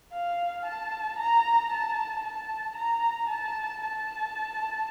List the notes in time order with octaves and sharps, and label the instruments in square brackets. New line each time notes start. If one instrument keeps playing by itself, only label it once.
[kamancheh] F5
A5
A#5
A5
A5
A#5
A5
A5